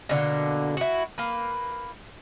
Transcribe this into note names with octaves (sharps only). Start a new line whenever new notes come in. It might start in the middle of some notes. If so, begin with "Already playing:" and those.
B2 D3 A#3
E4 F#4
A#3 B4